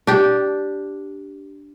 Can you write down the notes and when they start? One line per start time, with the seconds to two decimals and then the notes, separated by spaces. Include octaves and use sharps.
0.07 D4 G4